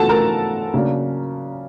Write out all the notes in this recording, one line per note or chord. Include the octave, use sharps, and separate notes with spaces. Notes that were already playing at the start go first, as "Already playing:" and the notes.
Already playing: C#3 E3 B3 F4 F#4 A4 F#5 A5
A#4 A#5
C#3 F#3 A#3 D4